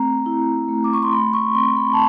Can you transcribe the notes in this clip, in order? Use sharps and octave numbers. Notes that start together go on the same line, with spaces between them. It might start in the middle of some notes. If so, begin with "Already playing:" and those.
Already playing: A3 C4 A#5
E4
A3
D6
C#6
C6
A3 B5
C#6
C4 C6
B5
A5